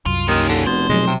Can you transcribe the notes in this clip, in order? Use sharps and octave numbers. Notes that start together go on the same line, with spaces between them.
C2 F#2 F4
D#2 D#3 C#4 F4
D3
F1 B2 C5
B2 F#3 G#3
C3